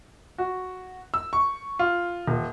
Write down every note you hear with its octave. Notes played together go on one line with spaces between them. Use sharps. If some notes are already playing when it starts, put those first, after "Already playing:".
F#4
E6
C#6
F4
D#1